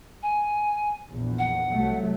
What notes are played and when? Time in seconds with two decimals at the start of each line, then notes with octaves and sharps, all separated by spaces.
0.23 G#5
1.09 A#1 E2
1.39 F#5
1.73 C2 F#3 A3